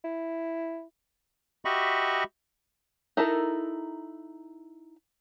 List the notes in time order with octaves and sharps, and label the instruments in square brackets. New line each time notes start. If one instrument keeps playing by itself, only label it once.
[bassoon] E4
[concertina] F#4 G4 D#5 E5 B5 C#6
[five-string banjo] D#4 E4 A4 A#4